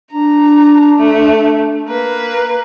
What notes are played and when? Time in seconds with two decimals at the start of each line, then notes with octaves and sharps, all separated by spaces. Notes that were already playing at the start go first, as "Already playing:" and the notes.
0.12 D4 A#5
0.97 A3
1.88 A#3 B4